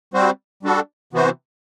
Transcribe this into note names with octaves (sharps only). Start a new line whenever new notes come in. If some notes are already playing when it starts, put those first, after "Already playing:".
G3 C4 F#4 C5
G3 D4 F#4 A4
C3 E3 B3 F#4 C5